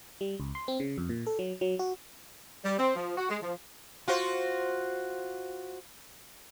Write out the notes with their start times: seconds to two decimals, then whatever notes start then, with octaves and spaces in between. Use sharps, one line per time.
0.21 G3
0.40 C#2
0.55 C6
0.68 C4
0.80 C#3
0.98 F2
1.09 A#2
1.27 A4
1.39 F#3
1.61 F#3
1.79 F#4
2.65 G3
2.79 C4
2.96 F3
3.17 F#4
3.30 G#3
3.41 F3
4.08 F4 F#4 C5